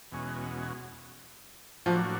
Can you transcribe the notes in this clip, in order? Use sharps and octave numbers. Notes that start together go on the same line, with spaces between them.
E2 B2 G#3 C#4 F#4
A2 F3 F#3 A#3 D4 F#4